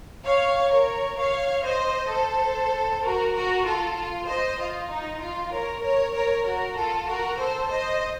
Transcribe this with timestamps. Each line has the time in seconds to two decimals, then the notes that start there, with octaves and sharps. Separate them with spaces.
0.24 C#5 F5
0.71 A#4 C#5
1.17 C#5 F5
1.64 C5 D#5
2.10 A4 C5
3.04 F#4 A#4
3.34 F#4 A#4
3.66 F4 A4
3.96 F4
4.27 C5 D#5
4.59 F4
4.90 D#4
5.21 F4
5.52 A#4 C#5
5.83 A#4 C#5
6.14 A#4 C#5
6.45 F#4 A#4
6.77 F4 A4
7.07 F#4 A#4
7.39 A4 C5
7.69 C5 D#5